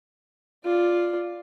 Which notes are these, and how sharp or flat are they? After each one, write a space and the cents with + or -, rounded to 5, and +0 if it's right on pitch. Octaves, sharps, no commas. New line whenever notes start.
F4 +0 D5 +0